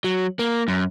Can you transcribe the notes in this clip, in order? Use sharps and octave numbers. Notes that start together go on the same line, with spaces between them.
F#3
A#3
F#2